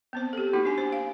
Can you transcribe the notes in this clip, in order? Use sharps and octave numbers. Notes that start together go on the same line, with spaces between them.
B3 C4 C5
G4 A4
A#3 D#4 E4 F#4
D4 D#4 G#5
C5
F5